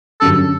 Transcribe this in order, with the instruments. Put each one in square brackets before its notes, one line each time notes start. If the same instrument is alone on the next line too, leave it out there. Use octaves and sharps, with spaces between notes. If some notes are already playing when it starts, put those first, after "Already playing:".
[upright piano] F#2 D3 G3 C#4 [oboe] A4